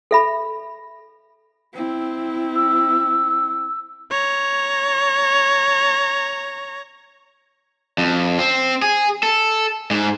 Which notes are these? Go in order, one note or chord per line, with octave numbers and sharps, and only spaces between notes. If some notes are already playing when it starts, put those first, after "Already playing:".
A4 E5 B5
C4 E4
E6
C#5 A#5
F2
C4
G#4
A4
G#2